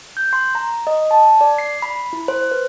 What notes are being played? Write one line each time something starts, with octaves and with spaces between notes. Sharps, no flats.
G6
C6
A#5
D#5
A5
D5
C7
B5
E4
C5
B4